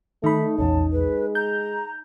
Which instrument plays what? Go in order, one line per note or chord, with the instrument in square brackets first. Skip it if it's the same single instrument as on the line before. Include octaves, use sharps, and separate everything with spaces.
[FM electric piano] D#3 B5 [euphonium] A3 [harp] D#4
[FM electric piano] A#1 E2 [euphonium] C#4 [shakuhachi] A5
[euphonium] G#3 [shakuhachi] B4
[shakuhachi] A#5 [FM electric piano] G6